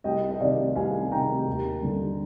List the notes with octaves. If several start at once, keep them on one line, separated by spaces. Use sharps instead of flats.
C2 D#5 G5
D#5
C3 D#3 D5 F5
C2 F5 G#5
C3 D#3 G5 A#5
D#2
D3 G3